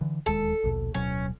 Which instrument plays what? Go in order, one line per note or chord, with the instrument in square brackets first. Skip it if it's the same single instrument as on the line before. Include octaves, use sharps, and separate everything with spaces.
[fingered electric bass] D3 E3
[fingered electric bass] D1 D#2 G#3 [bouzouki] A4
[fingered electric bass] A#1 D#2 B2
[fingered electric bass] D1 B2 F#3 [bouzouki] C#4